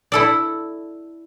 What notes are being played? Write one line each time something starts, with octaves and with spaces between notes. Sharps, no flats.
E4 A4 D5